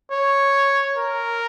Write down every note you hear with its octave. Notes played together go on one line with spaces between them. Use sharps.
C#5
A#4